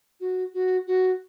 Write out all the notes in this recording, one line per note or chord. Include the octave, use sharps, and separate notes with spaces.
F#4
F#4
F#4